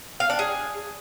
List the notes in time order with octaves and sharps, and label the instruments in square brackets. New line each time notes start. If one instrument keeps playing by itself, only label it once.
[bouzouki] F5
D4
G#4